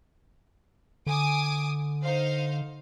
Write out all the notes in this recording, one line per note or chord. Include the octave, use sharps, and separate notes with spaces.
D3 G#5 D6 D#6
D#4 C5 F5